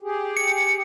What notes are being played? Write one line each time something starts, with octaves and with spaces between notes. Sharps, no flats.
G4 G#4
C#7